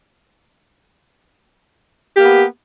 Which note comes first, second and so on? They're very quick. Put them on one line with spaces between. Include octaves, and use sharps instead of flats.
G4 A#3 B3